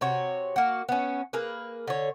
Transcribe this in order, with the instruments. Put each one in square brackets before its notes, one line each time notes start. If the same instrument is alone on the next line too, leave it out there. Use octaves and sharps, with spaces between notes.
[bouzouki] C3 F#4 C#5
A#3 F#4
B3 C#4
A#3 G#4 B4
D3 C#5